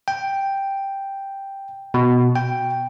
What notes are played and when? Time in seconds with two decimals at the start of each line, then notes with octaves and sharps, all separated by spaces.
0.08 G5
1.94 B2
2.36 G5